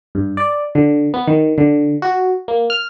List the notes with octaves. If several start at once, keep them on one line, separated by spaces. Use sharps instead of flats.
G2
D5
D3
B3
D#3
D3
F#4
A#3
F6